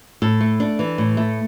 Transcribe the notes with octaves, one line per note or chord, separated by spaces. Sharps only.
A2 A4
A3
D4
E3
A2
A3